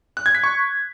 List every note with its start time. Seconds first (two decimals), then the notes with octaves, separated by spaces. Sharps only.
0.17 F#6
0.26 G#6
0.35 B6
0.43 C#6